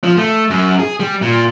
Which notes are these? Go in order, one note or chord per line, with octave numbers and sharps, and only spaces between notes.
F3
A3
F#2
G#4
G3
A#2